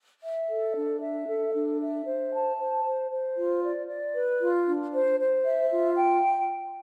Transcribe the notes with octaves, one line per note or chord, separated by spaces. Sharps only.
E5
A4
D4
E5
A4
D4
E5
C5
A5
C5
C5
C5
F4
D5
D5
B4
F4
D4
C5
C5
E5
F4
G5